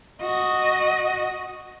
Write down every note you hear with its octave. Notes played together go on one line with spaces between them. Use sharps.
F#4 D#5